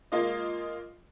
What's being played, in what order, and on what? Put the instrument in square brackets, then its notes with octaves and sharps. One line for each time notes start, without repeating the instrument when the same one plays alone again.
[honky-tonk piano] G#3 A#3 F4 D#5